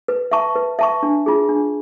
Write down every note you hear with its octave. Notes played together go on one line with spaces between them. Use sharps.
B4
E5 A5 C#6
B4
E5 A5 C#6
D4
F4 G#4
D4